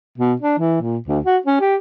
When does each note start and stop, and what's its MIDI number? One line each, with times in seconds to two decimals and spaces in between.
0.18 0.34 47
0.42 0.57 62
0.59 0.77 52
0.81 0.97 46
1.08 1.19 38
1.25 1.38 66
1.46 1.59 61
1.60 1.76 67